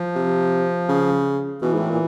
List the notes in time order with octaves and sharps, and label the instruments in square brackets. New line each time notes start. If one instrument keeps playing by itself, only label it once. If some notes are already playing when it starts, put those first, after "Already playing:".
Already playing: [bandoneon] F3
[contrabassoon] C3
C#3
[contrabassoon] B2 [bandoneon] E3
[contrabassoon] G#2
A2
A#2